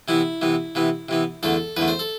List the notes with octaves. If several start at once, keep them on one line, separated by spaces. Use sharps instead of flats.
C3 E3 B3 E4
C3 E3 B3
C3 E3 B3
C3 E3 B3
E2 D3 A3 A4
E2 D3 A3 B4
C5
A4